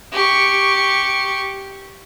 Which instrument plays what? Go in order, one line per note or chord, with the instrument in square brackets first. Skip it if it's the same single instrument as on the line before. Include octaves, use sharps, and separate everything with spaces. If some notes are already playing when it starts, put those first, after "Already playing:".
[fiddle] G4 C#6